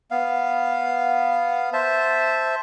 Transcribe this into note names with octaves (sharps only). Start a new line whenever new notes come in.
B3 F5
C5 E5 A5